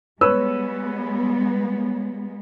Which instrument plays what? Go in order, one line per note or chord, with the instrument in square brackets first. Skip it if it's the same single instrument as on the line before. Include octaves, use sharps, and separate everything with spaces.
[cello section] G3 G#3 B3 [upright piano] B4 C#5 E6